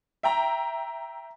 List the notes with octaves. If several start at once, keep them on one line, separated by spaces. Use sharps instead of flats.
E5 G5 A#5